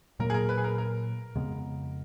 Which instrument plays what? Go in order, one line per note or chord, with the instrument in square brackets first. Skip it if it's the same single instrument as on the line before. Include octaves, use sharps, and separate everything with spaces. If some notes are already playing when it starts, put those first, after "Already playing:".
[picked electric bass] A#2 F#3 A#3 [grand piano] A#4
[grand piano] G#4
A#4
B4
G#4
A#4
A#4
[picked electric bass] F2 C#3 G#3 B3